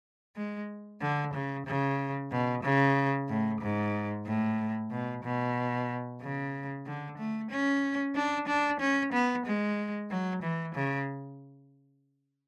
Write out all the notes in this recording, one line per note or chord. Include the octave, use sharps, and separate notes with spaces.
G#3
D3
C#3
C#3
B2
C#3
A2
G#2
A2
B2
B2
C#3
D3
A3
C#4
D4
D4
C#4
B3
G#3
F#3
E3
C#3